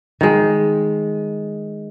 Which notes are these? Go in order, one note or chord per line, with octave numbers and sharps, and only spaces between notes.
D#3 G#3